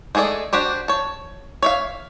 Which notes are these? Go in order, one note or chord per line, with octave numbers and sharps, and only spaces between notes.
G#3 A3 G#4 A4 D5
D4 F#4 G4 C5
C#5 A5
C#5 E5 F5